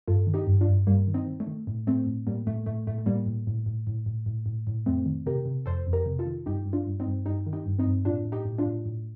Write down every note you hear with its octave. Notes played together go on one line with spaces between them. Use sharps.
G2 F4 A4
D#3
D#4 G4
G2
D4 F4
G2
G2 G3 A#3
D#3
C4 D#4
D#3
A3
D#3
A2
A2 A3 C4
A2
A2 G3 A#3
A2 A3
A2 A3
A2 A3
A3
A2 G3 A#3
A2
A2
A2
A2
A2
A2
A2
A2
F2 A3 C4
D#3
C3 G4 A#4
C3
F2 A4 C5
F2
G4 A#4
C3
F4 A4
D#3
G2 D#4 G4
G2
D4 F4
G2
C4 D#4
G2
G2 D#4 G4
D#3
D#4 G4
G2
C4 D#4
G2
A2 D4 F4
A2
D#4 G4
A2
D4 F4
A2
A2